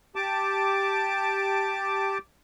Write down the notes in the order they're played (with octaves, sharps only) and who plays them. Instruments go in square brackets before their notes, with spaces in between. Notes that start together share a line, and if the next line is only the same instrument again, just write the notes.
[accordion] G4 A5 D6